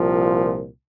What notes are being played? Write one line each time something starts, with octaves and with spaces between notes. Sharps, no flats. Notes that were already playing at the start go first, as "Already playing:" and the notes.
Already playing: C2 A#2 F3